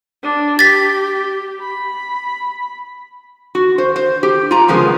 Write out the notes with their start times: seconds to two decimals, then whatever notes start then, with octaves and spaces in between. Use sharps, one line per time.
0.23 D4
0.59 G4 A6 B6
1.61 B5
3.55 F#4
3.78 C5
3.96 C5
4.23 G4
4.51 F4 A#5
4.68 C#3 F3 G#3 B3 A#4